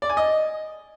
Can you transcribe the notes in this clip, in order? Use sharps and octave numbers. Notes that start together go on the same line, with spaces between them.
D5
G#5
D#5